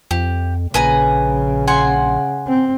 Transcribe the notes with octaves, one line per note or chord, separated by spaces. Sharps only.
F2 G4
A#1 C#3 B4 G#5 A#5
F#5 G#5 C6
C4